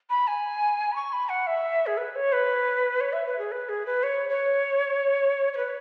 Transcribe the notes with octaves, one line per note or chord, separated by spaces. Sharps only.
B5
G#5
B5
C#6
B5
F#5
E5
G#4
B4
C#5
B4
C#5
E5
B4
G#4
B4
G#4
B4
C#5
C#5
C#5
B4